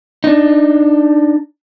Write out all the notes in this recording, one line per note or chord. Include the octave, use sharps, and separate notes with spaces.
D4 D#4